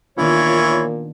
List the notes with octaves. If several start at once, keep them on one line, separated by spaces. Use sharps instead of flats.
A#2 D#3 E3 B3 D4 F4 C#5